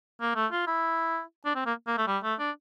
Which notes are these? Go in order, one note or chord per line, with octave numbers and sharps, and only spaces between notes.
A#3
A3
F4
E4
D4
C4
A#3
A#3
A3
G3
A3
D4